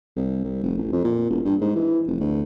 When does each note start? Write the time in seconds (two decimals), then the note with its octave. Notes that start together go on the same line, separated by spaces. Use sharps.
0.17 C2
0.44 C2
0.63 F1
0.77 A1
0.92 F2
1.04 A#2
1.30 E1
1.45 G2
1.61 G#2
1.76 E3
2.07 F1
2.20 D2